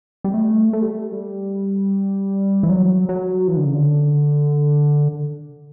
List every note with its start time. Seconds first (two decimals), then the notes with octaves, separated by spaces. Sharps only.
0.24 G3
0.34 A3
0.73 A3
0.82 G3
0.91 A3
1.12 G3
2.63 E3
2.69 F#3
3.09 F#3
3.48 E3
3.57 D3
3.66 C#3
3.75 D3